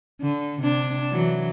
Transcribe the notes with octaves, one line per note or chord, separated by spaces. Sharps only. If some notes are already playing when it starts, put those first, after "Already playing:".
D3
C3 D4
E3 F#3